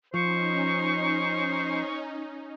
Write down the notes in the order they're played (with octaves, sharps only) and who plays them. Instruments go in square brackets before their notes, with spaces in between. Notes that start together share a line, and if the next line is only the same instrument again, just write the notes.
[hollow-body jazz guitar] F3 [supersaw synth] C#4 D#4 [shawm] C5 [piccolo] C#6